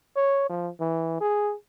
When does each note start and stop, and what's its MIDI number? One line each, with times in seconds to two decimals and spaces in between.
0.16 0.46 73
0.49 0.68 53
0.80 1.18 52
1.21 1.54 68